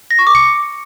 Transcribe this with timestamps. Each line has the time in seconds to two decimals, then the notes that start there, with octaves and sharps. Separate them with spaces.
0.11 A#6
0.19 C#6
0.27 D6
0.35 C#7